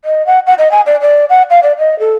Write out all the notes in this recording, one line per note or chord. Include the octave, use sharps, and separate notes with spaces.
D#5
F#5
F#5
D#5
G#5
D5
D5
F#5
F5
D5
D#5
A4